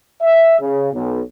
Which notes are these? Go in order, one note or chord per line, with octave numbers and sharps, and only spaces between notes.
E5
C#3
B1